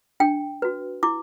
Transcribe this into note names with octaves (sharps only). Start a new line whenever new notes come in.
D4 G5
F#4 B4
E4 D6